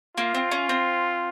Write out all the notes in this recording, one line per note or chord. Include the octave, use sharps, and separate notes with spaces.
A#3 F4
C4
C#4
C4